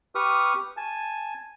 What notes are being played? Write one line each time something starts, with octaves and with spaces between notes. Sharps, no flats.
G4 B4 C#6 D#6 F6
G#5 A5